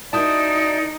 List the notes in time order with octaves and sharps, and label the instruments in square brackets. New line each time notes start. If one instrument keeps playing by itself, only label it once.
[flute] D#4 [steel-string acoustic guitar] E4 F#4 A#4 [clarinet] D5 [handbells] A5 D#6 G6